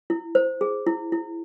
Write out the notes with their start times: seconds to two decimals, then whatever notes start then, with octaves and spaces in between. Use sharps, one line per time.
0.10 E4
0.35 C5
0.61 G#4
0.87 E4
1.12 E4